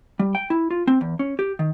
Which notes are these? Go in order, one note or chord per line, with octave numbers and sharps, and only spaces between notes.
G3
G5
E4
F4
C4
E2
C#4
G4
D#3